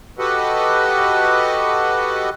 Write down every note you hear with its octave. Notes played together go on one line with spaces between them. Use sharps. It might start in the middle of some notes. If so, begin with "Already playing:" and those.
F#4 G4 A4 B4 D#5 F#5